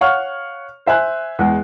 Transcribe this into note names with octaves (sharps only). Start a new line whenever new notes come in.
C#5 F5 F#5 C#6 F6
C5 E5 G#5 F#6
E2 G#3